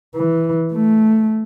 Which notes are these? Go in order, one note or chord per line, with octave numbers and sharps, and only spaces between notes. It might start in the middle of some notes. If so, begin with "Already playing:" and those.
E3
A3